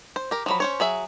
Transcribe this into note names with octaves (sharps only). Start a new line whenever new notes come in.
C5
G4 A#4
F3 F#3 B5
C#4 C5 C#5
F#3 G#4 E5